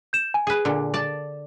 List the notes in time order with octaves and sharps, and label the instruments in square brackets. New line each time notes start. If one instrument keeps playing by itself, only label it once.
[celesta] G6 E7
G#5
[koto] G#4 B4
A#2 D3
D5 A5